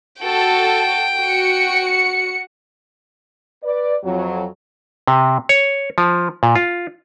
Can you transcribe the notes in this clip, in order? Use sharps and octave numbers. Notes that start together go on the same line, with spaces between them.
F#4 A4 G5
F#4 C#7
B4 D5
F2 F#3
C3
C#5
F3
A#2
F4